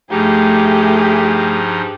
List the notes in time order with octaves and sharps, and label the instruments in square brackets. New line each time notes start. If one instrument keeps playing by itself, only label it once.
[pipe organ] G2 F3 D#4 [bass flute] A3 [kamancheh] G4 G#4